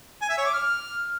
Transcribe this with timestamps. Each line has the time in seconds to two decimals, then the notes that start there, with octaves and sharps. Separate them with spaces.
0.22 G#5
0.30 E5
0.38 C#5
0.46 D6
0.54 F6